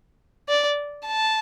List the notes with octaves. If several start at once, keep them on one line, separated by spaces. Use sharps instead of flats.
D5
A5